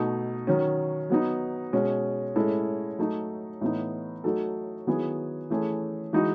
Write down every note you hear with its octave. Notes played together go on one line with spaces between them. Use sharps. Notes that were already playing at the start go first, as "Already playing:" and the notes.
Already playing: B2 A3 D#4
D#3 F#3 C#4
F#3 B3 D#4
B2 G#3 C#4
A2 G#3 C#4 E4 A4
F#3 A3 D#4 A4
A2 E3 B3 D#4
F#3 A3 D#4 F#4 A4
D#3 F#3 B3 E4 G#4
E3 A3 C#4 G#4
E3 G#3 D#4 F#4